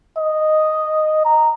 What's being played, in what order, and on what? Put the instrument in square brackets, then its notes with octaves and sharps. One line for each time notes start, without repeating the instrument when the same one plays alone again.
[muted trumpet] D#5
A#5